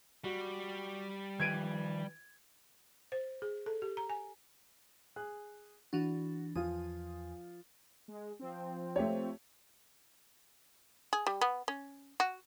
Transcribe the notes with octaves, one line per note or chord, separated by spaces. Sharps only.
G3 F#4
D#3 F3 B4 G#6 D7 D#7
C5
G#4
A4
G4
A#5
G#5
G#4 F#6
E3 D4 F#4
E2 F3 F4 G#5 D#6
G#3
F3 C4
A3 G4 C#5
G#4
G3
B3
C#4
F#4